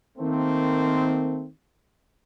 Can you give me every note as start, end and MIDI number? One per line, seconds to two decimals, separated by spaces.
0.18 1.46 51
0.18 1.46 57
0.18 1.46 58
0.18 1.46 60